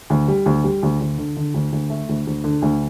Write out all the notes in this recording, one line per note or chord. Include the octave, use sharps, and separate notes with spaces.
D2
G3
D2
G3
D2
D2
D3
D3
D2
D2
A3
D2
D2
D3
D2